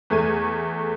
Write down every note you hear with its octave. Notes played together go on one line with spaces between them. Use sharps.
E2 A3 G#6 D#7